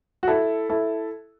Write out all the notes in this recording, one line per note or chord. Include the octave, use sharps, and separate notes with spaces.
F#4
E4 A4
E4 A4